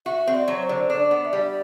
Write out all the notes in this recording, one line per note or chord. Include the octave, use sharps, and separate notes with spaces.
F#4 E5
C4
D5
F#3
C5
D3
D4 D5
B3
E5
G3 D5